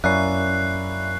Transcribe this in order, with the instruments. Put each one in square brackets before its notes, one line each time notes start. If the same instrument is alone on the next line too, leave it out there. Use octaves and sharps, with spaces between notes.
[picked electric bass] F#2 [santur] A#3 C#4 E4 [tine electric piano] D5 E5 [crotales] F#6 C7